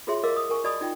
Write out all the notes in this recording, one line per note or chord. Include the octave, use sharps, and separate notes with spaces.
F4 F#4 G#4 C#5 E5 C6
A#4 D#5 F5 D6 E6
D#6
A#4 F#5 G#5 C#6
F#4 D5 D#5 A5 B5 D#6
D#4 F4 G5